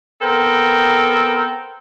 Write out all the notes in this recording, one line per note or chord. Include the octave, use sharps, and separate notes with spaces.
B3 C4 A4 A#4 G5